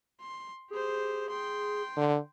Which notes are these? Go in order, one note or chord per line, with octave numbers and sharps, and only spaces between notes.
C6
G4 G#4 C5
G5 C6
D3